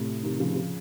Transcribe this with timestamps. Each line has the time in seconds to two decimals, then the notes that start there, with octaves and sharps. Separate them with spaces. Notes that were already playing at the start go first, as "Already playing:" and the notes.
Already playing: A2 C3
0.23 C3 D#3
0.40 C#3 F3
0.56 C#3 F3